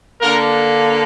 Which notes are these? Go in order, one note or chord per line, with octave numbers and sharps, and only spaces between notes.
D3 A#3 A#4